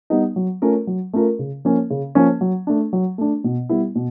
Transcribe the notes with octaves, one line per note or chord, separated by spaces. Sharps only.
G3 B3 D#4
F#3
A3 C#4 F4 A#4
F#3
A3 C#4 F4 A#4
C#3
F3 A#3 C#4
C#3
F3 A#3 C#4
F#3
A3 D4
F#3
A3 D4
B2
G3 B3 E4
B2